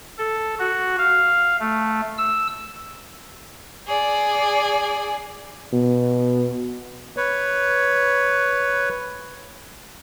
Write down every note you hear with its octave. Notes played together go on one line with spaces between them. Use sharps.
A4
F#4
F5
A3
E6
G#4 D5
B2
B4 C#5